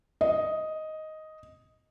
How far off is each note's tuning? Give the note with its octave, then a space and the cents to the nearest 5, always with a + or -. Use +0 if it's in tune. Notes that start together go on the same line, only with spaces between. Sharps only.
D#5 +5